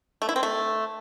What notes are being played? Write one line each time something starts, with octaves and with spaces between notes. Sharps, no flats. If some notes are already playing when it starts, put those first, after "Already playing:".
A3
E4
C4
A3